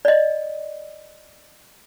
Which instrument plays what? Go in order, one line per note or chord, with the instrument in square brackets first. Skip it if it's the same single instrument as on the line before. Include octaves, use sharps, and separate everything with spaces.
[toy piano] D5 D#5